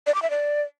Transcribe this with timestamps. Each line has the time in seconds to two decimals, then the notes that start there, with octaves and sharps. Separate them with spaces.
0.07 D5
0.15 D6
0.22 E5
0.30 D5